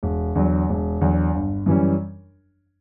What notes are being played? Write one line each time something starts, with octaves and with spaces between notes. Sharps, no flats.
E1
E2 D3 F#3
E1
E2 D3 F#3
G1
F#2 E3 G3 C#4